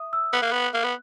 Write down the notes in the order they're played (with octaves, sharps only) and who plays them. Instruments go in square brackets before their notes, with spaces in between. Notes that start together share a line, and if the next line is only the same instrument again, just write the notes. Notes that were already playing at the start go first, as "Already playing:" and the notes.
Already playing: [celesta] E5 D#6
E6
[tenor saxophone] B3 [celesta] F#6
[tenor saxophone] A#3
B3
A#3
B3